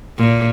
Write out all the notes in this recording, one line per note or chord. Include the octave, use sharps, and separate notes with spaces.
A#2